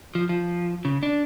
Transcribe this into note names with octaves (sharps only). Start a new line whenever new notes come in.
F3
F3
C#3
D4